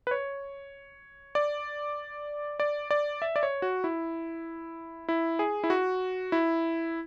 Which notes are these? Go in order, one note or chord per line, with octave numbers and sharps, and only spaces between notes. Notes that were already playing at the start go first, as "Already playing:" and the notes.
B4
C#5
D5
D5
D5
E5
D5
C#5
F#4
E4
E4
G#4
E4
F#4
E4